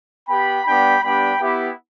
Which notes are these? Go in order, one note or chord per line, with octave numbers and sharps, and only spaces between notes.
B3 G4 G5 B5
G3 B3 D4 G4 G5 B5
G3 B3 D4 G4 G5 B5
B3 E4 G4